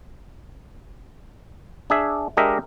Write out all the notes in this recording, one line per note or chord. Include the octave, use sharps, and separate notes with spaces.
D4 G#4 E5
G#3 D4 G4 A#4 D#5 E5